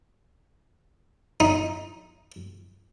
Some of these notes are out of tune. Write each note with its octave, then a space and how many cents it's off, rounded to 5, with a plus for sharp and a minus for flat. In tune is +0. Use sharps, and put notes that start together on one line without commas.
D#4 +10